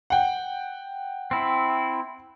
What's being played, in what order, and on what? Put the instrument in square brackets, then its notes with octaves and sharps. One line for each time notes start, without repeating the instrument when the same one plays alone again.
[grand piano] F#5 G5
[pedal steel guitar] C4 E4